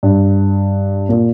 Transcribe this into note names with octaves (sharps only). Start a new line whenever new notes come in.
G2
A#2